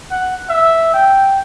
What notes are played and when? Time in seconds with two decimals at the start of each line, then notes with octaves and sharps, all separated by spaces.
0.11 F#5
0.49 E5
0.94 G5